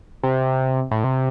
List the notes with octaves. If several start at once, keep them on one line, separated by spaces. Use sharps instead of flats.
C3
A2
C3